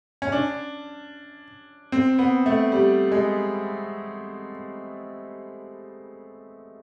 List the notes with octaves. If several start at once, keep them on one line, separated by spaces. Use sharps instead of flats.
C#4
D4
C4
B3
A3
G3
G#3